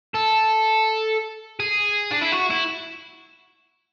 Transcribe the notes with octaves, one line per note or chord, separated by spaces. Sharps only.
A4
G#4
D4
E4
F#4
E4